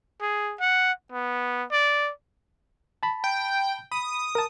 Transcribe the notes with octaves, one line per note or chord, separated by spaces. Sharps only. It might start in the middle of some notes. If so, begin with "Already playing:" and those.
G#4
F#5
B3
D5
A5 B5
G5
B5 D#6
A#4 A5